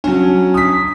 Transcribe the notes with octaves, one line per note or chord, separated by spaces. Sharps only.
F#3 C#4 D4
D#6 B6